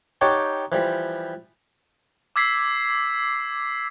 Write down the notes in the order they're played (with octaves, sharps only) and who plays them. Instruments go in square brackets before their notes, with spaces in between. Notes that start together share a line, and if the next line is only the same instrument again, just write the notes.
[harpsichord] D#4 G4 C#5 F#5 G5 A5
E3 F3 G3
[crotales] D6 E6 G#6 B6 C7